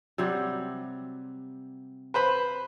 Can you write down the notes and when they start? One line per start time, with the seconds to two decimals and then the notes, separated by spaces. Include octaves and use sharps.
0.18 C3 F#3 G3
2.14 B4 C5 B5